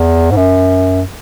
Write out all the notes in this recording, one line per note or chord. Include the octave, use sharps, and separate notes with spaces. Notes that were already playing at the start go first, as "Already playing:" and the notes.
Already playing: E2
G#2
F#2